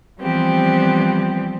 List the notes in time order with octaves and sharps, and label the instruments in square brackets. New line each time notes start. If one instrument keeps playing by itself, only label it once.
[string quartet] E3 F3 G3 B3 C4 G4